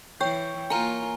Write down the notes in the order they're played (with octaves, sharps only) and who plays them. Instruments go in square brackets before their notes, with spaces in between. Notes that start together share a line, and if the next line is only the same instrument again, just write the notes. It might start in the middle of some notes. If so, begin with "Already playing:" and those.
[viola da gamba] E3 [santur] C#5 [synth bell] G5 G6
[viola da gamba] A#3 F4 [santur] A#4 [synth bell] G#5 A#5